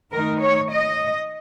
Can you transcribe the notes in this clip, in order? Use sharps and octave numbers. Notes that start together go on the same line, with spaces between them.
D#3 A3 D#4 A#4
C#5
D#5